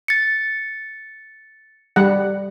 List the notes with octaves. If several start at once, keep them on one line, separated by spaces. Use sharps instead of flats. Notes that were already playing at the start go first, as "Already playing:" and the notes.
A6 C#7
G3 F#5